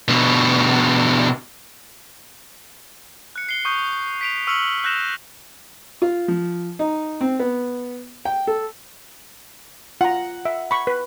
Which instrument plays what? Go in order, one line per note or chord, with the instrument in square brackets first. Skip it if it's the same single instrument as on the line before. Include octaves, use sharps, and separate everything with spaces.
[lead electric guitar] B2 D3
[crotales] F#6 C#7
C7 G7
C#6 D#6 G6
B6 D7 F7
C#6 E6 F6 B6 C#7 F#7
E6 F#6 G6 A#6 E7 F7
[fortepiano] F4
F3
D#4
C4
B3
G5
A4
[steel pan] F4 A#5 [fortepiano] F#5
[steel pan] E5
B5 C#6
B4